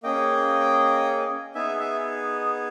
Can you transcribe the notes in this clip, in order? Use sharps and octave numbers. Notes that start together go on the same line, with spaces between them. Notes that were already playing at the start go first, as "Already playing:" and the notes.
A#3 C#4 G#4 D#5 G5
B3 D#4 G#4 E5 G#5
E5 G#5